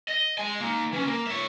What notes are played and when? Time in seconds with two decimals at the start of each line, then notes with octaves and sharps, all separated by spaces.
0.08 D#5
0.38 G#3 G#5
0.60 A#3 D#4
0.92 E3 C#4
1.07 A#3
1.27 C#5 E5